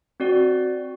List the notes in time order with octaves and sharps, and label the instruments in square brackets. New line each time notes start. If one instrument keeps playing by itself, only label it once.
[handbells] C4 F#4 D5